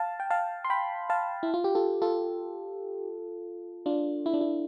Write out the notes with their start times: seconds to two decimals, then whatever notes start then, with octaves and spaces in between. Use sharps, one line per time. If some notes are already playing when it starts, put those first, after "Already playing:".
Already playing: F5 A5
0.20 G5
0.30 F5 A5
0.65 C6
0.70 G5 B5
1.10 F5 A5
1.43 E4
1.54 F4
1.64 G4
1.75 F4 A4
2.02 F4 A4
3.86 D4 F4
4.26 E4
4.34 D4
4.41 E4